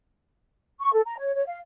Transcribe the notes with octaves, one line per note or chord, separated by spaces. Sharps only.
C#6
A4
A#5
C#5
C#5
F5